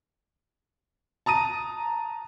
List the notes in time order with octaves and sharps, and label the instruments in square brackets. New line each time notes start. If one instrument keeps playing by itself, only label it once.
[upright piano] A5 A#5 D#6 D#7